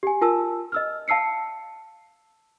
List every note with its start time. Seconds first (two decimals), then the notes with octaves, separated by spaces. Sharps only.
0.03 G4 G#5
0.21 F4 A#4 G#5 A5 E6
0.72 D#5 E6 F6
1.08 F5 A5 E6 C7 C#7